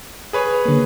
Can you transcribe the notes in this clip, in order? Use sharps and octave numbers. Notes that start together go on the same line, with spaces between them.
G#4 B4 C#5
D3 A#3